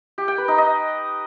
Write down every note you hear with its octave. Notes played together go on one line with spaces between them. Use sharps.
G4
G5
B4
D#4
D#5